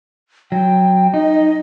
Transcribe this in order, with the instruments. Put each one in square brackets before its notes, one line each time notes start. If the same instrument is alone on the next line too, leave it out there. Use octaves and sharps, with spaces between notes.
[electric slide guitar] F#3 [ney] G5
[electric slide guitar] D#4 [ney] D#5